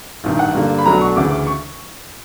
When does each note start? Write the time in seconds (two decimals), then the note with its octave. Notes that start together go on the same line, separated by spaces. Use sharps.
0.24 A1 G2 D#3
0.39 F#5
0.55 G2 D3 G3 A#3
0.78 B5
0.86 B1 B2 F#3 A3 D4 A#5
1.01 C#6
1.16 D2 C#3 E3 D6
1.31 D6
1.47 C#6